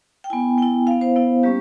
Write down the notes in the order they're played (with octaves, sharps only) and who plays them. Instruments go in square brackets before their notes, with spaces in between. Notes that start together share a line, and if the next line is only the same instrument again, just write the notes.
[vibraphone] G5
B3 E4 G#5
B3 E4 G5
B3 E4 F5
C5
B3 E4
G3 A#3 C#4 G4